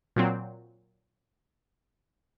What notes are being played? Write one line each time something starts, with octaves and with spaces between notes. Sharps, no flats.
A#2 F#3 C4